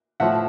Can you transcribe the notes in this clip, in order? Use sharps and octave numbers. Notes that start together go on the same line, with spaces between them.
A2 F3 E5 F#5